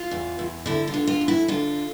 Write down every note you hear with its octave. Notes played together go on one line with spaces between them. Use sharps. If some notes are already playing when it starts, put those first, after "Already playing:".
Already playing: F4
E2
E2
D3 E4
F4
D3
F4
E2
E4
D3 F4